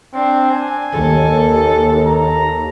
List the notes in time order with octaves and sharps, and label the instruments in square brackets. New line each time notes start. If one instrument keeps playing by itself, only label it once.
[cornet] C4 [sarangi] D4
[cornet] G#5
[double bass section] D#2 [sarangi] A4
[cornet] A#5